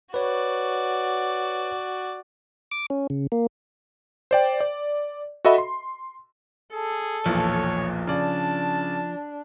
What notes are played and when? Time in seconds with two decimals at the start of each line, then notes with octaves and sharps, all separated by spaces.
0.14 F#4 B4 C#5 D5
2.72 D6
2.90 C#4
3.10 C#3
3.32 A#3
4.31 C5 D5 G5
4.60 D5
5.45 F#4 A4 D#5 E5 B5
5.58 C6
6.73 G#4 A4
7.26 B1 E2 A#2 F3 C#5
8.07 C#3 D4 D5 A5